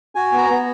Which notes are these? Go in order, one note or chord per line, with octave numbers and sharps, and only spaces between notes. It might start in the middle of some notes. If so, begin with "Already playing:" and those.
F#4 G#5
B3
A#5
B3